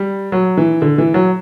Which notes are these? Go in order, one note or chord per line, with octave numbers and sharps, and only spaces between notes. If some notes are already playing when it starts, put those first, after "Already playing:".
Already playing: G3
F#3
E3
D3
E3
F#3